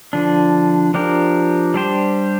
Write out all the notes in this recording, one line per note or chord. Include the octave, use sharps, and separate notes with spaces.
D3 F3 D4
F3 D4 G4 A#4
G3 D4 G4 C5